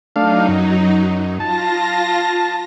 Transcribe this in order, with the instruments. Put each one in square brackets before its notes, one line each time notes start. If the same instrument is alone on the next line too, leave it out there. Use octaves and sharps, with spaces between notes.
[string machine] F#3 D#4 [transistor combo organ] A3 D4 F5
[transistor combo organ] F#2
[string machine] F4 A#6 [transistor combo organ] A5